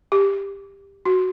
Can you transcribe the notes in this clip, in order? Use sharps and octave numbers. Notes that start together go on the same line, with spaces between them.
G4
F#4